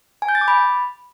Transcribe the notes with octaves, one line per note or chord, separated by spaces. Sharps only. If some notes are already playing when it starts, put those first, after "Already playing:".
G#5
G6
A6
D6
B5